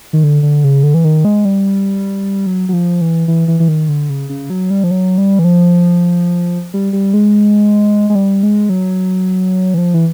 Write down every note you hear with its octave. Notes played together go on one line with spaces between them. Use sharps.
D#3
D3
D3
C#3
D3
E3
D#3
G#3
G3
F#3
F#3
F3
E3
E3
E3
E3
D#3
D3
C#3
C#3
F#3
G3
F3
F#3
G3
E3
F3
G3
G3
G#3
G#3
G3
G#3
F#3
E3
F3
E3